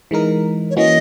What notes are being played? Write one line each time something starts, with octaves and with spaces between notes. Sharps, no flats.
E3 G#3 D#4 A#4
C#5
E3 A#3 C#4 F#4 D#5